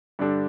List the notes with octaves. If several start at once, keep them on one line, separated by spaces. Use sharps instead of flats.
G2 D3 G3 D4 A4